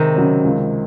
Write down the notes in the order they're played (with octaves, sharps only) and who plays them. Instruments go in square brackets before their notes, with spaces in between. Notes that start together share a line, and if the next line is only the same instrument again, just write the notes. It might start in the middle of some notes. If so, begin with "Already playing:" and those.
Already playing: [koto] C3 D#3 G#3
[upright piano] C#3 F#3 C#4
C#2